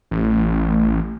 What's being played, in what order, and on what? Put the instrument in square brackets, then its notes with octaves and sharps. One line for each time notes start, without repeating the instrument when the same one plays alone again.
[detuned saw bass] A1